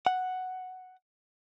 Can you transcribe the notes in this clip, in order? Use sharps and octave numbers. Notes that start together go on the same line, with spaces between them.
F#5